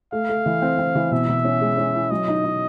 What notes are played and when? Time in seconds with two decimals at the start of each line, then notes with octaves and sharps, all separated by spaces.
0.12 A3 F5
0.29 A3
0.46 E3
0.62 C4
0.79 C4
0.95 E3
1.11 B2 E5
1.28 B2
1.45 C#4
1.61 G#3
1.77 C#4
1.94 E4
2.11 F#3 D#5
2.28 D#4
2.44 D#4